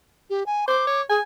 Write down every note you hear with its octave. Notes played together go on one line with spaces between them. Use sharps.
G4
G#5
C5 D6
C#5
G#4 G#5